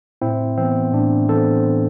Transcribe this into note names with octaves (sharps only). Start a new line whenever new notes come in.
A2 C4 E4
E3 B3 C4
A2 D4
E3 B3 A4 C5